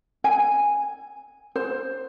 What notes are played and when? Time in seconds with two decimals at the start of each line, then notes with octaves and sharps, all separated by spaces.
0.24 G#5
1.56 C5